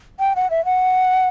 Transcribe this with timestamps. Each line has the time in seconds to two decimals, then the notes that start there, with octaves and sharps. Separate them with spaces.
0.20 G5
0.36 F#5
0.50 E5
0.65 F#5